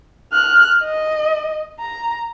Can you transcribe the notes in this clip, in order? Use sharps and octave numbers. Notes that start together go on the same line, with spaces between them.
F6 F#6
D#5
A#5